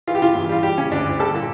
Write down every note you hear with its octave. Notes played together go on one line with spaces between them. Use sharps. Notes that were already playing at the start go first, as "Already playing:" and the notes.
E3 F4
G4
C#3 F4
E2
G3 F4
G3 G4
C#3 C#4
D2 D4
D2
G3 A4
A#2